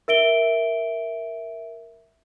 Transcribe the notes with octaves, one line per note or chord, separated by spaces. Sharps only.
A#4 E5 D7 G7